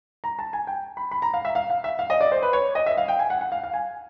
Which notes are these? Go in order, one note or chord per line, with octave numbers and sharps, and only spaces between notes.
A#5
A5
G#5
G5
B5
B5
A#5
F5
E5
F5
F5
E5
F5
D#5
D5
C5
B4
C#5
D#5
E5
F5
G5
G#5
F#5
F#5
F5
F5
G#5